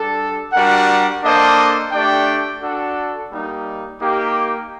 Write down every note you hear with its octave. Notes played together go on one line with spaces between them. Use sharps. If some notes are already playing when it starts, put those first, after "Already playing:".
Already playing: G3 D4 A4
G3 D4 F#4 A#4 F#5
A#3 D4 A4 C5 D#5
A3 D4 G4 D5 G5
D4 F#4 A4
G3 A#3 D#4
A#3 D#4 G4